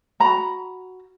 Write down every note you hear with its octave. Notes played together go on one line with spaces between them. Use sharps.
F#4 A#5 B5